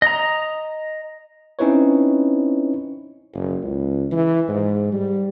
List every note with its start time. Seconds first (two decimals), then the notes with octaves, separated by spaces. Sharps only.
0.02 D#5 A#5
1.59 C4 C#4 D#4 E4 B4 C#5
3.34 F#1
3.63 C#2
4.11 E3
4.49 G#2
4.92 G3